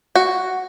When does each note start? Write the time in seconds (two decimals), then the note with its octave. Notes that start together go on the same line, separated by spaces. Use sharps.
0.15 F#4